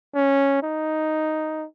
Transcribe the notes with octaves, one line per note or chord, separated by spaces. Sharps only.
C#4
D#4